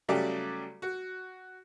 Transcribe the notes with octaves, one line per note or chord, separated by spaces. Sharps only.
C#3 F#3 G3 A3 G4 D5
F#4